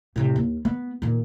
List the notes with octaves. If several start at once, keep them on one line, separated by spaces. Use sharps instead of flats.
A2 C3
D#2
B3
A#2 D#3